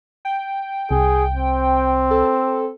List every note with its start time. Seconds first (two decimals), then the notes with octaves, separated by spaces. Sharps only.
0.25 G5
0.91 C2 G#4
1.34 C4
2.11 A4